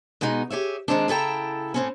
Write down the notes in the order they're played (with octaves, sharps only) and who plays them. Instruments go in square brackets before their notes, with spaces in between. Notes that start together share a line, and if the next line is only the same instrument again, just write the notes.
[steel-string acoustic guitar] B2 G#3 B3 D#4
G4 G#4 C#5 E5
D#3 G#3 C4 D4
C#3 E4 A4 G5 A#5
A2 C4 C#4